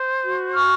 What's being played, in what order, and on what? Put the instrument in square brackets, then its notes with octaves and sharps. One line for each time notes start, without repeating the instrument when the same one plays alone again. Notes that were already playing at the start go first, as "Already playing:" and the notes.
Already playing: [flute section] C5
F#4
C#6 F6